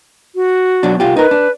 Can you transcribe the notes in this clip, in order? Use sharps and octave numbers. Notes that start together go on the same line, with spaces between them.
F#4
B2 F#3 D4
C2 F4 G4
D#4 A#4 B4
D4